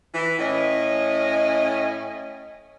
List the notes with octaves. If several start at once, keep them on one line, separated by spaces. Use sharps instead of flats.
E3
A2 C#4 D#5